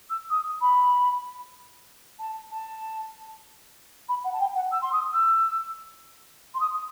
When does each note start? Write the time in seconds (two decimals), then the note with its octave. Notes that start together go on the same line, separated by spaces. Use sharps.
0.09 E6
0.30 D#6
0.61 B5
2.19 A5
2.51 A5
4.08 B5
4.24 F#5
4.32 A5
4.39 G5
4.55 F#5
4.71 E6
4.81 C6
4.92 D#6
5.12 E6
6.54 C6
6.60 D#6